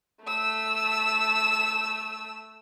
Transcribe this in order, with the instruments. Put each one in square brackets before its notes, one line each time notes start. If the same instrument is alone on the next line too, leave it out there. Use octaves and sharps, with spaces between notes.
[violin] A3 E6